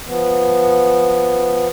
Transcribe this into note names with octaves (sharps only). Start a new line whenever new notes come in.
F3 B3